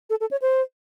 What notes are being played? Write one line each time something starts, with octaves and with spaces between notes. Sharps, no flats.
A4
A4
C#5
C5